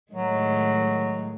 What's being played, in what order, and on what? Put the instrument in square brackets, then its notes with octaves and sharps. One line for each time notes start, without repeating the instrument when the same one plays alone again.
[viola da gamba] A2 D#3 G#3 [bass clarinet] F#3